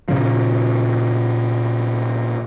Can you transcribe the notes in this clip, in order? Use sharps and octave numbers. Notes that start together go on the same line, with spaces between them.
A#2 C#3 F3